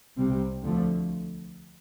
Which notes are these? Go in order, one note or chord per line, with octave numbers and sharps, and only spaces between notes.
C2 C3 G3 C4
D2 D3 F3 A3